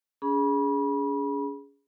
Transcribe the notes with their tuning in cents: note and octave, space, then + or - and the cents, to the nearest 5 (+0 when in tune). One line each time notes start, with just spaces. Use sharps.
C#4 +40 G#4 +0 B5 -30